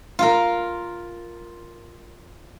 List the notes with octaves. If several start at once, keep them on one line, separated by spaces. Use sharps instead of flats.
F4 A#4